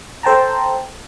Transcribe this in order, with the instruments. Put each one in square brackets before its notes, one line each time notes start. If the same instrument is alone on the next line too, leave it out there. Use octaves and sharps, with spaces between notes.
[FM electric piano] A4 C5 G5 A5 A#5